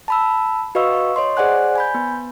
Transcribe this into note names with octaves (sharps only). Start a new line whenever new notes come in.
A5 B5 E6
F#4 B4 D#5 F5 C#6 E6
C#5 D#5 C6
G#4 C5 D5 F#5 G#5 F#6
G#5 B5 G6
B3